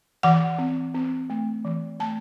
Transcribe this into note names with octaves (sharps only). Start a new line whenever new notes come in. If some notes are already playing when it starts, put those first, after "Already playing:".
E3 F#5
C4
C4
A3
E3
A3 A5